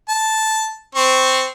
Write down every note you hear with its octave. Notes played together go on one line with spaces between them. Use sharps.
A5
C4 C#6